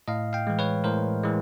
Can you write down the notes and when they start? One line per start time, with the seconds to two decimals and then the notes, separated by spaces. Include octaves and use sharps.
0.08 A2 D#5 F5
0.33 F5 G5
0.47 E3 G#3
0.59 B4 C#5
0.84 A2 A#4 C5
1.23 E3 G#3